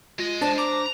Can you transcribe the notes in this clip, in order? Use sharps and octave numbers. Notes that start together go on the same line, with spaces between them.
G#3 F4 D#5
D4 C5 A5
A#5 D6